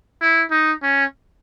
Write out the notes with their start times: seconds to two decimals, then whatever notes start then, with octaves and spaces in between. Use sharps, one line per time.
0.21 E4
0.51 D#4
0.83 C#4